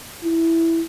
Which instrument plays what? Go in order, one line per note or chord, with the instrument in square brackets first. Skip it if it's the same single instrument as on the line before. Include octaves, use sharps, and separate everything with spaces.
[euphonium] E4